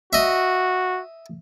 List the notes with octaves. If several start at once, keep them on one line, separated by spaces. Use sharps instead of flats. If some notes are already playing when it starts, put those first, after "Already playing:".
F#4 D#5 E5